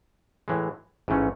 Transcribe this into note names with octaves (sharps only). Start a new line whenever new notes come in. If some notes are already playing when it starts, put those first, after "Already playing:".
A2 E3 G#3
A1 G#2 E3 A3 C#4